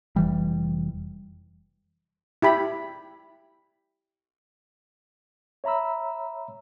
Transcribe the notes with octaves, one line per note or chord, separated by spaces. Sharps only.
F1 E3 G3
E4 G4 B5
C#5 E5 A#5 B5 E6